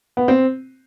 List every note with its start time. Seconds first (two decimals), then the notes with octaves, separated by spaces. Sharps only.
0.17 B3
0.28 C4